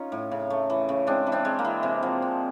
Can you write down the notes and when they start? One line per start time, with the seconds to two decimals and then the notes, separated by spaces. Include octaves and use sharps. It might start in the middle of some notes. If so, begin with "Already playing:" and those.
Already playing: C#4 D#4 F4
0.12 A2
0.32 C#3
0.50 A3
0.70 E3
0.89 C#3
1.07 G#3 C4 D4
1.26 E3
1.32 C4 D4
1.45 G#3
1.59 A#3
1.65 E3
1.83 C3
2.03 F3
2.22 C3